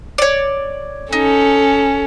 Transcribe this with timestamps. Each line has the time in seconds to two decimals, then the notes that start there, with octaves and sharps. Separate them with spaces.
0.18 C#5 D5
1.13 C#4 D#4 A4